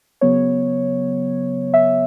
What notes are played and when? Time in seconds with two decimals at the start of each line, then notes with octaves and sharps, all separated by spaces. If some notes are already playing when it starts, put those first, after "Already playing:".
0.21 C#3 F#3 B3 C#5
1.74 E5